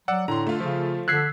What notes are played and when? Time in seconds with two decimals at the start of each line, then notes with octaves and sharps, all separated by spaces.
0.08 F#3 D5 F#5 E6
0.28 A2 D3 A#5 C6
0.47 A3 F4
0.60 C#3 F3
1.08 D3 E6 F#6 G#6 B6 C7